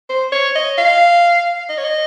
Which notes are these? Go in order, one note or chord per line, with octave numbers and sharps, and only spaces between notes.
C5
C#5
D#5
F5
D#5
C#5
D#5